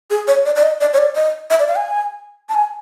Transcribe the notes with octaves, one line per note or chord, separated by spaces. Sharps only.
G#4
C#5
D5
D5
D#5
D5
C#5
D5
D#5
E5
D5
F5
G#5
A5
G#5